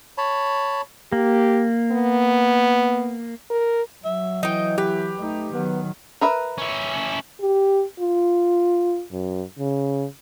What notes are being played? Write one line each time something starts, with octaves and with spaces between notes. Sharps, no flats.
C#5 A5 B5
A#3 G4
B3
A#4
F#3 E5
E3 D#4 D#5 G5
G4 B4
A3 D#4
D#3 F#3 B3
A#4 B4 E5
C#4 E4
G4
F4
F#2
C#3